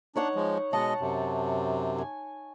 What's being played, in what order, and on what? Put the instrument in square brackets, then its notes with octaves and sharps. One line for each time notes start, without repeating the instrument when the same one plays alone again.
[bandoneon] D4 [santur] D#4 C#5 F#5
[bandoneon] F3 G#3
[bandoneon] B2 G#3 D#5 [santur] F#5 A5
[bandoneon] F#2 C3
[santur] G#5